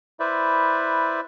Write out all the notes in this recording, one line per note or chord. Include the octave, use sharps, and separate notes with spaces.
E4 B4 C5 D5 E5